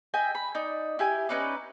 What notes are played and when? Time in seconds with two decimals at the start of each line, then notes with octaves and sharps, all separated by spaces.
0.14 D#5 E5 G5 G#5
0.35 B5
0.55 D#4 D5
0.99 E4 G4 G#5
1.29 C#4 D#4 B4 D5